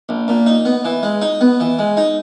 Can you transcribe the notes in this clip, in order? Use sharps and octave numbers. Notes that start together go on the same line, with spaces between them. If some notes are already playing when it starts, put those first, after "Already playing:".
A#1
A#2
D#4
B3
E3
G#3
D#4
B3
E3
G#3
D#4